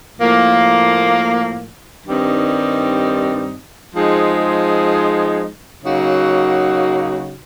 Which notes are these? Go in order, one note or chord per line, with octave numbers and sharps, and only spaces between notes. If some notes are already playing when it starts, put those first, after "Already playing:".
A2 F3 A#3
G2 D#3 G3 C4 D#4
F3 G#3 C4 D#4 G#4
C#3 F#3 A#3 D#4 F#4